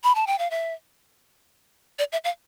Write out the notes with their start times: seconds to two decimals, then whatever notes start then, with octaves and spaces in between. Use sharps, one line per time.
0.04 B5
0.15 A5
0.27 G5
0.39 F5
0.51 E5
1.99 D5
2.12 E5
2.24 F5